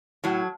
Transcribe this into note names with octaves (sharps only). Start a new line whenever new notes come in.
A2 F#3